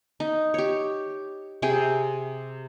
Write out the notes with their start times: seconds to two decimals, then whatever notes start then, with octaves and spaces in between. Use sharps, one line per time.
0.20 D#4
0.54 G4 C#5
1.62 C3 G#4 G5 G#5